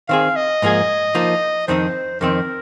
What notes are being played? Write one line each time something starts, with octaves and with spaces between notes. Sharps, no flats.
D#3 C4 G#4 F5
D#5
G#2 F3 A#3 G#4
F3 A#3 D#4
F2 D#3 C4 D#4 C5
F2 D#3 C4 A#4